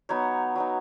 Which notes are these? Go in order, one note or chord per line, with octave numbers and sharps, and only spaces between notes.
F#3 B3 D#4 C#5
F#3 B3 D#4